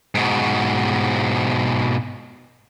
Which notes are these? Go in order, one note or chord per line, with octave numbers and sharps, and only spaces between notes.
G#2 B2